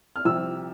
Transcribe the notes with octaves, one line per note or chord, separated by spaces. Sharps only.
F6
C2 C3 F3 C4 E6